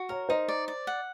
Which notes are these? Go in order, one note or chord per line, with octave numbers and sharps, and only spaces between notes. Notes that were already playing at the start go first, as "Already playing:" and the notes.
Already playing: F#4
A#4 C#5
D#4 C5
D5
D5
F#5